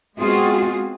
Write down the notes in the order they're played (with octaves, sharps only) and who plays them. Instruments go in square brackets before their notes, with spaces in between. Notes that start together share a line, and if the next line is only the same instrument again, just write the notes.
[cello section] G#3 B3 C4 F4 F#4 G#4